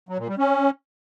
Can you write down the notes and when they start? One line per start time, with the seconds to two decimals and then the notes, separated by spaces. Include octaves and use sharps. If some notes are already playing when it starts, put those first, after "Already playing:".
0.09 F#3
0.19 A#2
0.28 G3
0.38 C#4